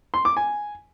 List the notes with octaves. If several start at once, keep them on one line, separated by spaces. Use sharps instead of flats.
C6
D6
G#5